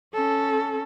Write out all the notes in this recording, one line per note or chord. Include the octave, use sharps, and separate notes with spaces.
C#4 A4